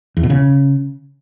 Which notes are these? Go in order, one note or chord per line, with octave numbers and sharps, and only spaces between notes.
E2
B2
C#3